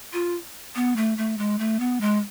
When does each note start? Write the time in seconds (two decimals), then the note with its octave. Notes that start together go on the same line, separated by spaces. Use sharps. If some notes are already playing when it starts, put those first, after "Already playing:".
0.13 F4
0.75 B3
0.96 A3
1.18 A3
1.38 G#3
1.59 A3
1.80 B3
2.01 G#3